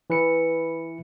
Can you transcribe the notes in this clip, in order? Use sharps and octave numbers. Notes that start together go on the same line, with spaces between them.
E3 B4 C#7